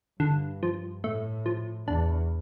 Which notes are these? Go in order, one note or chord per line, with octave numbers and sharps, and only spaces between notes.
G2 D3
F3
A2 A3
F3
E2 D4